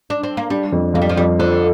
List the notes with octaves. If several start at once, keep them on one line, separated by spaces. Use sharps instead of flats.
D4
C4
A#3
G3 D4
F2
F2 A#3
G3
F3
F2 G3
D3 F3